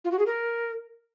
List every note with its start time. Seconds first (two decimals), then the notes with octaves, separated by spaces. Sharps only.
0.05 F4
0.12 F#4
0.19 G#4
0.26 A#4